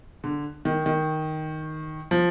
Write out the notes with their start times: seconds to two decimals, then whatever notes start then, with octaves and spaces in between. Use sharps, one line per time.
0.24 D3
0.65 D#3
0.86 D#3
2.11 F3